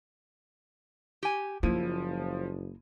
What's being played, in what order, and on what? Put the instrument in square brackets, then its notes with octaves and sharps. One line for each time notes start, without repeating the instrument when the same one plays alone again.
[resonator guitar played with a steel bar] G4 G#5
[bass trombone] F#1 [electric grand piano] F3 D#7 [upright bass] A#3 [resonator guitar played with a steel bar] E4